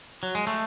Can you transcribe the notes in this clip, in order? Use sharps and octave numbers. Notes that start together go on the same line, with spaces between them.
F#3
G#3
A3